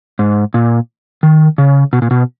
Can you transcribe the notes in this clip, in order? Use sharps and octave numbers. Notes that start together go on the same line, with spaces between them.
G#2
A#2
D#3
C#3
B2
A#2
B2